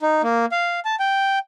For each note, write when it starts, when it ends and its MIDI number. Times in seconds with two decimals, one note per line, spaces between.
0.01 0.22 63
0.23 0.46 58
0.52 0.80 77
0.85 0.96 81
1.00 1.39 79